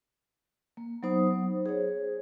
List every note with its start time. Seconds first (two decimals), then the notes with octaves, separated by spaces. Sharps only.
0.77 A#3
1.03 F#3 B3 D#4 C5 F#5 D#6
1.66 G#4 C5 C#5